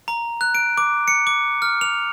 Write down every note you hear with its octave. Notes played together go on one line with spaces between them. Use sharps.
A#5
F#6
D7
D6
C#7
D6
F6
F7